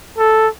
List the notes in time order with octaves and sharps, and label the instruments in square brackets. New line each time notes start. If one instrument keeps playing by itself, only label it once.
[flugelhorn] A4